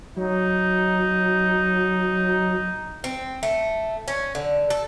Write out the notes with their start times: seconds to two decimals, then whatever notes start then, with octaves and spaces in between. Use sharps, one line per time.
0.16 F#3 D#4
3.04 C4
3.43 A3
4.08 C#4
4.35 D3
4.70 A4